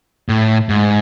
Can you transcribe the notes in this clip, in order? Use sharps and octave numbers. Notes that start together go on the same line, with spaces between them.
A2
G#2